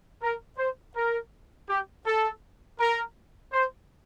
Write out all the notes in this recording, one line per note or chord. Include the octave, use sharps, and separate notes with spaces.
A#4
C5
A#4
G4
A4
A#4
C5